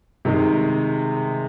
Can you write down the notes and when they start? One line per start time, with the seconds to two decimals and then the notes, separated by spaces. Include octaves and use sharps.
0.25 C3 D#3 G#3 D#4